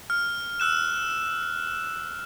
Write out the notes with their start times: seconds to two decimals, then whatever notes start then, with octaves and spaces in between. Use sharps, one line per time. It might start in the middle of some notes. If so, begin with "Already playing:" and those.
0.10 F6
0.60 E6 F#6 E7